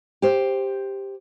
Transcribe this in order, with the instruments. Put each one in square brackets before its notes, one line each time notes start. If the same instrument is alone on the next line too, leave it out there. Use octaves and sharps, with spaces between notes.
[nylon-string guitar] G4 C5